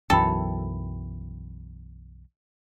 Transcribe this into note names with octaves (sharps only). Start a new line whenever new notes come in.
B1 F#2 E3 A4 G5 B5